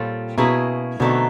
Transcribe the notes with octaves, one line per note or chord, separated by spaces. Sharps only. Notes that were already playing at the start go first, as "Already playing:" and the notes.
Already playing: A#2 G3 C4 F4 A4 C#5
B2 A#3 C#4 E4 G#4 B4
B2 D3 F#3 A3 C4 D#4